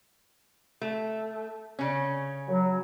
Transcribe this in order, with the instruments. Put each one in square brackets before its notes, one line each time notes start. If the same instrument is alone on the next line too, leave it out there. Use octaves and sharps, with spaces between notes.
[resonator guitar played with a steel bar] A3
C#3 C#4
[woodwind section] F#3